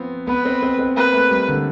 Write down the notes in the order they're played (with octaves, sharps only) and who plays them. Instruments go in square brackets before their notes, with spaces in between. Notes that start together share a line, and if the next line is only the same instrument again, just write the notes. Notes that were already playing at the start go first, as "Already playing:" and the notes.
Already playing: [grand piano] F3 B3 C4
[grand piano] B3 [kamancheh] B4
[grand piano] C4
C4
C4
[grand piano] A#3 [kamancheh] B4
[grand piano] A3
G3
D3